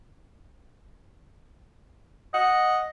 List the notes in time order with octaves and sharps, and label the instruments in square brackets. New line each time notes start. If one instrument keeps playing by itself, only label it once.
[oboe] D#5 [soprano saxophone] F#5